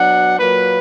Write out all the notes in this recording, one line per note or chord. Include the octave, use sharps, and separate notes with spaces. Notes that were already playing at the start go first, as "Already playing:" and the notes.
Already playing: B2 F#3 D4 F#5
A#2 F#3 A#3 B4